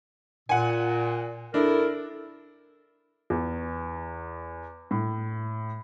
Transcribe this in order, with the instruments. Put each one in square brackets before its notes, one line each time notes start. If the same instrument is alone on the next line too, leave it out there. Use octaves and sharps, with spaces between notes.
[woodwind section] A#2 [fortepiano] F#5 G#5
[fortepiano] D4 [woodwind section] E4 A4 A#4
[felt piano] E2
A2